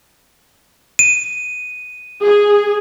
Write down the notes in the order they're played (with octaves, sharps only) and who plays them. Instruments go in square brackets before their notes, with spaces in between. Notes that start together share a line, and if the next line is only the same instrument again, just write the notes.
[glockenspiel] D#7
[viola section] G#4